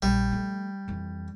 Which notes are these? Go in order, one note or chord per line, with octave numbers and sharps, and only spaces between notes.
A#1 G3
F3 A3
F2 E3